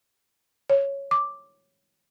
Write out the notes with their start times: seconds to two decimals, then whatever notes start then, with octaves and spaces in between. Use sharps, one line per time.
0.70 C#5
1.11 D6